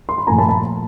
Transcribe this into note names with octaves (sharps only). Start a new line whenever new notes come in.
C6
B5
A#2 F3 A3 G#5 A#5
A5 B5
A5 B5